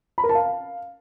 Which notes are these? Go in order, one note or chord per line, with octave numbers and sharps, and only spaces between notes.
B5
A#4
A5
F5